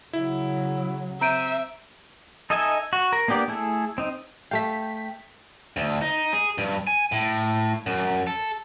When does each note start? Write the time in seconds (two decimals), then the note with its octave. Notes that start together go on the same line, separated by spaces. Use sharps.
0.13 C#3 F#3 E4
1.21 C4 E5 A#5 G6 D7 D#7
2.50 D#4 A4 D#5 E5 G#5
2.93 F#4
3.13 A#4
3.28 A#3 B3 D4 G4 D5
3.48 A3 E4 G#4 A4
3.98 C4 D#4
4.51 A3 F5 G5 B6
5.77 D2
6.02 D#4
6.33 G#4
6.58 G2
6.87 G#5
7.12 A2
7.86 F#2
8.27 A4